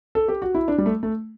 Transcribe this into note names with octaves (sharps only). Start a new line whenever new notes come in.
A4
G4
F#4
E4
D4
G3
A3
A3